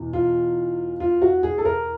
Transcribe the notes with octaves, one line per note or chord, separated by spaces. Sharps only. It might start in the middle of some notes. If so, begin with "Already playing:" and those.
Already playing: E2 B2
F4
F4
F#4
G#4
A4
A#4